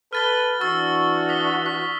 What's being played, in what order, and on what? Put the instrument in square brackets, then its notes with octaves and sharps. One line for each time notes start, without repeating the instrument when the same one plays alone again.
[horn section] A4 B4 [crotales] F6 A6 G7
[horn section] E3 D4 F#4 [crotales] C#6 E6 A6
[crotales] G7
D#6 B6 G7
B6